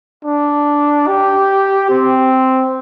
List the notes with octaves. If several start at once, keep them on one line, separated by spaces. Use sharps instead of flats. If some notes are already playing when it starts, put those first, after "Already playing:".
D4
G4
C4